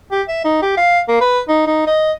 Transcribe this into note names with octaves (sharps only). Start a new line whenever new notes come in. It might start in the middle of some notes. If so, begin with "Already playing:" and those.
G4
E5
D#4
G4
F5
A#3
B4
D#4
D#4
D#5